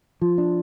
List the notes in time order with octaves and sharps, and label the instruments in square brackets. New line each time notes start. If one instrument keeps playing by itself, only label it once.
[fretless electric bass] F3 [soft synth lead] F4
[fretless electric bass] D4